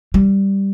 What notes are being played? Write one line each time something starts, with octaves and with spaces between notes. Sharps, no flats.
G3